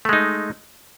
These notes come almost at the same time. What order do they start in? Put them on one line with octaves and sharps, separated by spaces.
A3 G#3 D#4